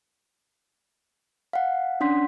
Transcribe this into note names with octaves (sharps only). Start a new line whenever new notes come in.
F5 F#5
C#4 D4 F#5 C6 B6